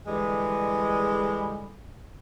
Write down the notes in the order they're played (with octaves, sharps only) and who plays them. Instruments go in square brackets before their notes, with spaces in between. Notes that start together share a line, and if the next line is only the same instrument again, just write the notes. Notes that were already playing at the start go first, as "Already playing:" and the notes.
[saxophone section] D3 E3 G3 G#3